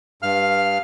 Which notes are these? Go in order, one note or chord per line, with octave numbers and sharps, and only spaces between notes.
G2 F5 F6